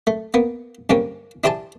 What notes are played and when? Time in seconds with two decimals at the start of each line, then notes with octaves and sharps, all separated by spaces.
0.07 A3
0.34 A#3 B3
0.90 G2 D3 A#3 C4 C#4
1.44 D4 E4 G4 C5 G#5 A5